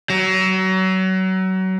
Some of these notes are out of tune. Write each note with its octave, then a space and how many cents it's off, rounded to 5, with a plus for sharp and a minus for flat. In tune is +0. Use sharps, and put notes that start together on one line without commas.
F#3 +30